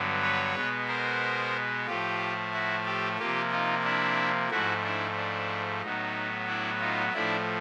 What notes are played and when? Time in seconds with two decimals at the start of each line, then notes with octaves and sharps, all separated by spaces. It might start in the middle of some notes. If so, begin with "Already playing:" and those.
Already playing: G2 D3 F#3 B3
0.22 B4 C#5
0.56 B2 G#3 B3
0.88 A#4 C5
1.86 A2 F3 A3 F4 G4
2.53 E4 F#4
2.86 G4 A4
3.19 C3 F3 A#3 F4 G4
3.52 D#4 F4
3.84 D4 E4
4.50 G#2 F3 A3 E4 F#4
4.83 D4 E4
5.16 D4
5.82 A2 F#3 B3 D#4
6.47 D4 E4
6.80 D#4 F4
7.13 A2 F3 A3 D4 E4